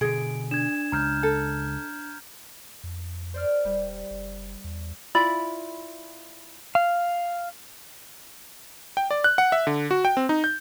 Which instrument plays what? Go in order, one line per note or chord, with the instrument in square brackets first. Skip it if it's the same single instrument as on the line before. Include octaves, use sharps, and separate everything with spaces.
[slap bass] B2 D3 [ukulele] G#4 [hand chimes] D7
[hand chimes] D4 [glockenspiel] G#6 E7
[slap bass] C#2 [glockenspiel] A#5 F6 G6
[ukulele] A4
[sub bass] F2
[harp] C5 D5 F6
[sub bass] E1 [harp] G3
[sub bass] F#1
E2
[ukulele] E4 F4 D5 B5
[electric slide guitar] F5
[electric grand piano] G5
D5
F#6
F#5
E5
D3
F#4
G5
C4
D#4
G6